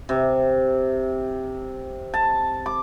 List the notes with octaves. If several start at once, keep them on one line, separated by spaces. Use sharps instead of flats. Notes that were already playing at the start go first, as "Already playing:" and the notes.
C3
A5
D6